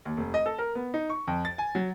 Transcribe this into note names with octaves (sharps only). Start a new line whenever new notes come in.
D#2
F1
D#5
A4
A#4
B3
D#4
C#6
F2
A6
G#5
F#3